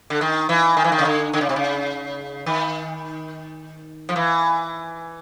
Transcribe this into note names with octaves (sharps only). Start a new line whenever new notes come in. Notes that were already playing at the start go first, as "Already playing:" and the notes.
D3
D#3
E3
D#3
E3
D#3
C#3
D3
D3
C#3
C3
C#3
D#3
F3
E3